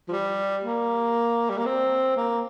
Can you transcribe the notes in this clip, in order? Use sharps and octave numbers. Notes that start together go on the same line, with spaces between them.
F3
G3
A#3
G3
A#3
C4
A#3